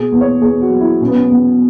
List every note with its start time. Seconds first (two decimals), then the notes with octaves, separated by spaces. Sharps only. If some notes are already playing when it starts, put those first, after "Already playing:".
Already playing: B2 G#4
0.12 E2
0.21 C#5
0.41 E2 G#4
0.61 F#4
0.70 F#3
0.81 E4
1.00 B2 C#4
1.08 B3
1.15 C#4
1.30 E2